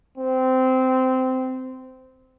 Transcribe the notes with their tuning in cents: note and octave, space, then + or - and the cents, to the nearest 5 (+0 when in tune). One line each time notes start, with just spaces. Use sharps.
C4 -15